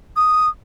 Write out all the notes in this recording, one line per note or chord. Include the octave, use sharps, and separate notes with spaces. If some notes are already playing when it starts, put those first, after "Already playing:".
D#6